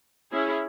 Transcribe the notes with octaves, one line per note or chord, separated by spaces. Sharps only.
C#4 E4 G#4